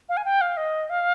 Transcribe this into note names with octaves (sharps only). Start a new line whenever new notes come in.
F5
G#5
G5
F5
D#5
F5